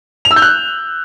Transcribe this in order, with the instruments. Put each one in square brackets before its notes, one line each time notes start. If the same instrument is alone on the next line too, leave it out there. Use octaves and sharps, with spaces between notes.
[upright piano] F7
E6
G6
F#6